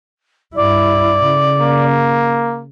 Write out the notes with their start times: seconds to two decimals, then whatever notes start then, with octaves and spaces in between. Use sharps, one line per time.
0.55 G2 E4 D5
1.24 C#3
1.61 A#3